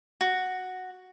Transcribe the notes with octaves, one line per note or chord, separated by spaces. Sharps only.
F#4